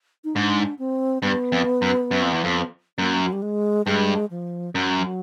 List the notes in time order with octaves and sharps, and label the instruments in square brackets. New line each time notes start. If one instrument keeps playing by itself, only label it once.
[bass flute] D#4
[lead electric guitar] G#2 [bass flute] D4
[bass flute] C4
[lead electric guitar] G2 [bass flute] B3
[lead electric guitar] F2
F#2
F#2
F2
E2
F2
[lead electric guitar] F#2 [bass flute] A#3
[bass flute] F#3
G3
G#3
[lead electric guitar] G2 [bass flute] G#3
[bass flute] F3
[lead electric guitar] F#2 [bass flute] F#3
[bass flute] F3
F#3